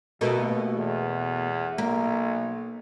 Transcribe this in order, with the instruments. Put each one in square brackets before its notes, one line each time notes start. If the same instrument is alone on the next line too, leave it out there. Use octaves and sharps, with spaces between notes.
[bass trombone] G1 [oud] B2 A3 A#3
[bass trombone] E2
[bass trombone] B1 [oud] A#3